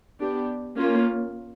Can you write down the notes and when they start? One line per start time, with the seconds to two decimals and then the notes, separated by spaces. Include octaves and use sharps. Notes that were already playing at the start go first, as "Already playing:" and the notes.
0.20 B3 D4 G4
0.77 A#3 C#4 F4